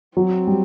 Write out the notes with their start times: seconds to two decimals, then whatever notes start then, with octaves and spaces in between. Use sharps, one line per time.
0.17 F#3 C4
0.47 G3